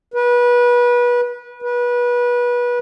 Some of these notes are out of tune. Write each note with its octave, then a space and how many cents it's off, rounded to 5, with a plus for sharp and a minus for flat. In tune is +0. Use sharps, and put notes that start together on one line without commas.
B4 -25
B4 -25